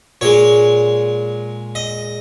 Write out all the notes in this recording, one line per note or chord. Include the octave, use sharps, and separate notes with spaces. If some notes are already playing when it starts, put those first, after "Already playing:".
A#2 G#3 C#5
D#5